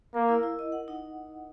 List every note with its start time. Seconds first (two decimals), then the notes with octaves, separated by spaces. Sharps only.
0.14 A#3 A#4
0.29 E4
0.43 E4
0.59 D#5
0.72 F#5
0.88 D#4